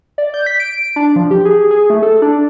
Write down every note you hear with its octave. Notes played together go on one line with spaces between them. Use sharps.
D5
G6
B6
D7
D4
F3
G4
G#4
G#4
A3
A4
D4